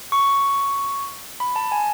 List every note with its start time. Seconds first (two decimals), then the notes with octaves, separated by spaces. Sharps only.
0.12 C#6
1.40 B5
1.56 A5
1.72 G#5